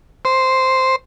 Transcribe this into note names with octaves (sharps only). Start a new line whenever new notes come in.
C5